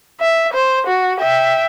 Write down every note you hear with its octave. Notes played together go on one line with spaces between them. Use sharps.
E5
C5
F#4
E5 G5